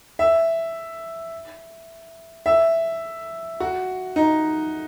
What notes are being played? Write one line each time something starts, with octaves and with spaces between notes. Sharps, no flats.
E5
E5
F#4
D#4